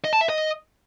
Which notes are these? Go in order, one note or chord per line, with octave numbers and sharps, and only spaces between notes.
D#5
A5
E5
D#5